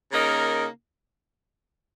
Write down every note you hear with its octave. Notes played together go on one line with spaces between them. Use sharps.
C#3 A#3 D#4 A#4